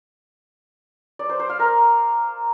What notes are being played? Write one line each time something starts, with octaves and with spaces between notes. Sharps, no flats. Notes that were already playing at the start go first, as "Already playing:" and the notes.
D5
C5
C5
F5
A#4